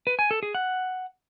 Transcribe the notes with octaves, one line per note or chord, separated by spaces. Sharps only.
B4
G#5
A4
G#4
F#5